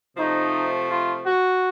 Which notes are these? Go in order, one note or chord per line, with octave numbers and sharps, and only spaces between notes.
C3 F3 A3 D#4
F4
F#4